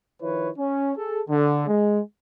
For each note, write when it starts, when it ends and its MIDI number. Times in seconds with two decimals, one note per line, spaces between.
0.21 0.49 51
0.21 0.49 53
0.21 0.49 64
0.21 0.49 71
0.21 0.49 73
0.58 0.91 61
0.96 1.21 68
0.96 1.21 69
1.29 1.66 50
1.67 2.00 56